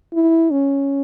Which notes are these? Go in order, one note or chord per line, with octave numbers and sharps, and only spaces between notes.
E4
C#4